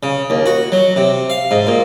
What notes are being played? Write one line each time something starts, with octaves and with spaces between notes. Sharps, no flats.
C#3
D#2
F#4
F#3
C3
F5
G#2
A#2